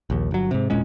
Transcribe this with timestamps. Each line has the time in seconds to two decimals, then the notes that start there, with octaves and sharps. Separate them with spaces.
0.10 A#1 D#2
0.31 G1 F#3
0.51 G#2 C3
0.70 E1 A#2 G#3 C#4